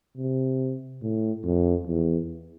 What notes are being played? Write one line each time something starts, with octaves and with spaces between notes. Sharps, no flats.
C3
A2
F2
E2